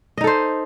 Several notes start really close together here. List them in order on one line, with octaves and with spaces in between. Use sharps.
D#5 D#4 A4 C5